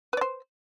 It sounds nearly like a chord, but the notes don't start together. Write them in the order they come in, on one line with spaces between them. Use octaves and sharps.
B4 D5 C5